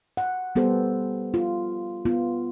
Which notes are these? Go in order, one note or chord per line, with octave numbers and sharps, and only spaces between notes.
F#5
G3 B3 G4 A4 C5
F4
B3 F4